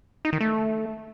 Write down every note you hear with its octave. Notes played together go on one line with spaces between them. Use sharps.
D#4
D#3
A3